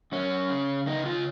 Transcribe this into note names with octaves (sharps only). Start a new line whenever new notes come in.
F#2 C#4
C#3
C#3 D#4
F4